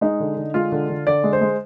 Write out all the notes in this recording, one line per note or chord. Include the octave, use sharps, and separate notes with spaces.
G#3 D#4
D3
D3
G#3 F4
D3
D3
D3 D5
G#3
C5
G#3